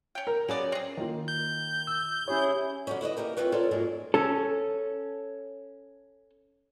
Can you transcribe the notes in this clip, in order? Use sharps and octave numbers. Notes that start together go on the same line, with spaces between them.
C#4 G5
A#4
F#3 A#3 B3 C#4 G#4 D5
C4 G#4
D#3 A#3 F4
G6
E6
C#4 E4 G4 G#4 C#5
D3 F#3 C#4
E4 B4 D5 D#5
E3 A#3 G4 A#4
C4 C#4 F4 B4 C#5
F4 A4 A#4 C#5 D5
F2 G#2 F#3 G#3 A#3
C#4 A4